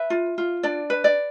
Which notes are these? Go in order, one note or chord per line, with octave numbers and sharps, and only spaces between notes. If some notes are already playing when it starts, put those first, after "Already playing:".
Already playing: B4 E5
F4
F4
D4 D5
B4
D5